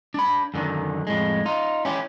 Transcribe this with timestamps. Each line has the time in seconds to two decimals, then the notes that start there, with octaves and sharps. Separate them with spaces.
0.14 D4 B5
0.54 F#2 D3 D#3
1.07 F2 A2 G#3
1.46 D#4 F4
1.85 C#4 E4 G4